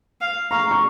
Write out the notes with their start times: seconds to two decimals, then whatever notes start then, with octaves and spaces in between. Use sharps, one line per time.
0.21 F5
0.51 F5 A#5 C#6
0.71 A#5 C#6